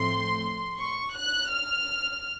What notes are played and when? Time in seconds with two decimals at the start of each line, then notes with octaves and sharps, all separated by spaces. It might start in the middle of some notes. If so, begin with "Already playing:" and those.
Already playing: A2 F3 A3 C4 C6
0.79 C#6
1.15 F#6
1.52 F6